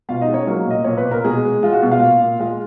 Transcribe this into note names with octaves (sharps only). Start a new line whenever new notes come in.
B2 F4 F5
D#4 D#5
G#3
C#4 C#5
F#3 A#3 A#4
A#2 D#5
A#2 C#5
B4
A#2
A#4
B2 G#3 G#4
G#3
G#3 F4
F#4
B2
F4 F5
A#2
A#2
G#3 F4 F5